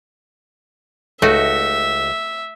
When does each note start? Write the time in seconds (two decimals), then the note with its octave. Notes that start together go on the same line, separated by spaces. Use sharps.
1.22 C#2 A3 D#4 F#4 E5